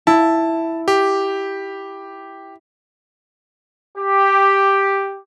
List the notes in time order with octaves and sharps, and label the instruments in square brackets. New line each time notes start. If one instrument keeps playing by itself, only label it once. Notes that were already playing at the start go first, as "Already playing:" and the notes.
[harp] E4 [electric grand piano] A5
[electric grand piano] G4
[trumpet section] G4